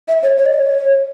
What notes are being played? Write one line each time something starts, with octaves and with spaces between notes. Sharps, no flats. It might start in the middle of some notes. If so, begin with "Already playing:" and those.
E5
C#5
C#5
D#5
C#5